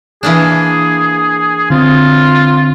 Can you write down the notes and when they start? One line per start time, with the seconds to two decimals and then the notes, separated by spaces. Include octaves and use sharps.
0.23 E3 A#3 D4 G#4
1.70 D3 C4 F4